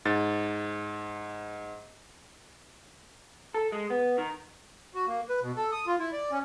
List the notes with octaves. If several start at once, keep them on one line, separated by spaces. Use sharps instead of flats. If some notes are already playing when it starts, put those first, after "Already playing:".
G#2 A6
A4
G#3
B3
D#3
F#4
A#3
B4
B2
A4
D#6
F4
E4
D5
C#4